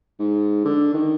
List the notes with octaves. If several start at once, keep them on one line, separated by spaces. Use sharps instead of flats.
G#2
D3
D#3